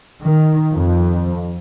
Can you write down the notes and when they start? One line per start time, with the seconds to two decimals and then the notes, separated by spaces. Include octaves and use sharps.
0.23 D#3
0.73 F2